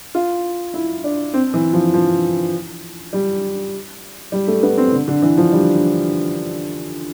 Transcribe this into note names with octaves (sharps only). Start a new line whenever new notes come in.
F4
E4
D4
C4
E3
F3
F3
G3
G3
A3
B3
C4
D3
D3
E3
F3
G3